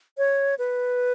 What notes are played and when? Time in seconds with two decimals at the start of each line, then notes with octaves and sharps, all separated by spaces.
0.18 C#5
0.59 B4